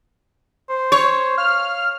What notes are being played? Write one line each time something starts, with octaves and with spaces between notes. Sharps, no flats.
C5
C#5
F5 F6